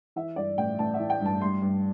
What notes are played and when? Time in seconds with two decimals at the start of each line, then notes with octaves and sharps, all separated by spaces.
0.16 E3 E5
0.36 G2 D5
0.58 A1 G5
0.79 A1 A5
0.94 E5
0.99 E3
1.10 G5
1.21 G2 A5
1.41 G3 C6
1.62 G2